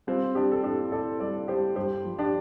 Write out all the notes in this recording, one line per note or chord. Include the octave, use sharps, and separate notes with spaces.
G3 C4 F4
G3 D4 G4
A4
A2 D4 G4
A2 A4 D5
G3 A4 D5
G3 G4 C5
G2 G4 C5
F3
D4 G4